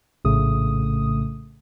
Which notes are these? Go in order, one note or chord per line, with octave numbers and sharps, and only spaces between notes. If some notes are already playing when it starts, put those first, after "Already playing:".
A#1 A2 C#3 A3 D#6